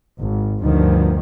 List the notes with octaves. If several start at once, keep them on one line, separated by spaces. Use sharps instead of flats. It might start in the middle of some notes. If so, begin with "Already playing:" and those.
G#1
D2 G2 D#3 F3